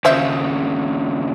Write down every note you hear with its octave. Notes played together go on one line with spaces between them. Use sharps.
D#2 C#3 F3 C5 E5